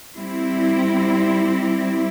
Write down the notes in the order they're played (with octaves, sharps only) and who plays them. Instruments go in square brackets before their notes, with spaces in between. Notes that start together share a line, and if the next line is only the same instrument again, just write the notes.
[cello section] G3 C4 E4